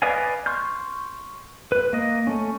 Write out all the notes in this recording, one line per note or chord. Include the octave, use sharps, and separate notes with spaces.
B4 D5 D#5 F5 G#5
C6 C#6 F6 G6
B4
A#3 D#5
A3 C#4